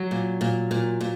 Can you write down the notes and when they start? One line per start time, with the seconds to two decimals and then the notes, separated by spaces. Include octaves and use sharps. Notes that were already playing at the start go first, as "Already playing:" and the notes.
Already playing: F#3
0.11 A#2
0.41 A#2
0.71 A#2
1.00 A#2